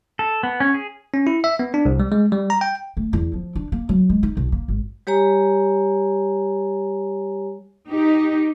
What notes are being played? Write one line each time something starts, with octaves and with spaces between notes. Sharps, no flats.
A4
B3
C#4
G#4
C#4
E4
E5
B3
D4
C2
G3
G#3
G3
A#5
G5
A3
E2
F3
D4
A#3
F#3
G#3
D#4
B1
A#3
G#1
G3 G4 C#5 G#5 A#5
D#4 G4